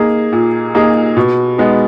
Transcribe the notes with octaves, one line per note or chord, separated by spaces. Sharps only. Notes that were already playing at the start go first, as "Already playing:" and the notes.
Already playing: A#3 D#4 G#4
A#2
A#3 D#4 G#4
B2
G#3 B3 D#4